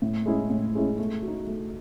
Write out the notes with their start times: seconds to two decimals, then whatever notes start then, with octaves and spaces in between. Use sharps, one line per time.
0.02 A2
0.26 G#3 C#4 E4 G#4
0.50 A2
0.75 G#3 C#4 E4 G#4
0.98 A3
1.22 F#4
1.28 D#4
1.47 A3